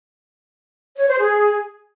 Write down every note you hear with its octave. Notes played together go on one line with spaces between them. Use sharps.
C#5
C5
G#4